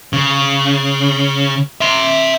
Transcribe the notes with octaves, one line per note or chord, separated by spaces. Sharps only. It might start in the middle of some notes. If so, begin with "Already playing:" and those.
C#3
E5 C6